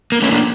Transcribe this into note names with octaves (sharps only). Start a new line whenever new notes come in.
A#3
A3 C#4
A#3 D4